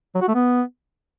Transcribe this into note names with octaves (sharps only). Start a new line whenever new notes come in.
F#3
F#4
A3
B3